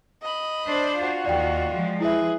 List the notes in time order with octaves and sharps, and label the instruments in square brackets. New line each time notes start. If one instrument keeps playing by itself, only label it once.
[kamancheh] D#5 B5
[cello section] D4 C5
[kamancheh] F4 F#4
[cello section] D#2 [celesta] D5 G5
[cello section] F3 G#3
[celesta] E4 E5 [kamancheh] G#4 B4